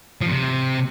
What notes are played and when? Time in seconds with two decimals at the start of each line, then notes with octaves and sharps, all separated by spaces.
0.21 F3
0.26 F2
0.32 C3